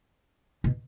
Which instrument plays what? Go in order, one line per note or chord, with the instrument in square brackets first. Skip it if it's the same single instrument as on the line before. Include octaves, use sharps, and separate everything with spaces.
[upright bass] B2